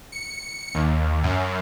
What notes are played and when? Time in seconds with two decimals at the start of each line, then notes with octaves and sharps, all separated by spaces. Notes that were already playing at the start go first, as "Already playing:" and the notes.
0.12 C#7
0.75 D#2
1.23 F#2